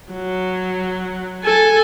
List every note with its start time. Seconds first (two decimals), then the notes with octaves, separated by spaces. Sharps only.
0.12 F#3
1.44 A4 G#5